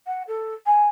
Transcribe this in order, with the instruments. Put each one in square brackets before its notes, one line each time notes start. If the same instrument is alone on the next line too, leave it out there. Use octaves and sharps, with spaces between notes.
[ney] F#5
A4
G#5